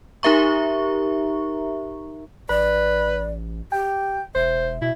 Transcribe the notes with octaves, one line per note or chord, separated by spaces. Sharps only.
D#4 G4 A#4 E5 A#5 C#6
A1 B4 D5
G4 G5
E1 C5 E5
B2 E4